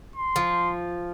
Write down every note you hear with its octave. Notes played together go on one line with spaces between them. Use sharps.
C6
F3